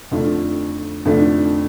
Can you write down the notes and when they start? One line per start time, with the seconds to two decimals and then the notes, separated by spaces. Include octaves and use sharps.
0.11 F2 D3 A3 D4 F4
1.05 F2 D3 A3 D4 F4